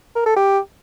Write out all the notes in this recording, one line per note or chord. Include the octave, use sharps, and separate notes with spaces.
A#4
A4
G4